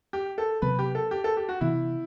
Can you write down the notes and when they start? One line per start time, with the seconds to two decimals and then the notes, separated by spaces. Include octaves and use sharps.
0.13 G4
0.38 A4
0.62 C3 F#3 B3 B4
0.79 G4
0.95 A4
1.11 G4
1.24 A4
1.37 G4
1.49 F#4
1.61 C3 E3 B3 E4